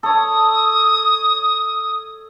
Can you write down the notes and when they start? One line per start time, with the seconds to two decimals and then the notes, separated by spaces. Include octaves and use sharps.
0.03 A4 C#5 D#6